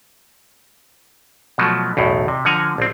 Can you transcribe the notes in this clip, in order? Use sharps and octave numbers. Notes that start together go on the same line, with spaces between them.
B2 F3 F#3 A3
B1 E2 A2
C3
D3 F3 F#5 G#5 A#5
A#1 C4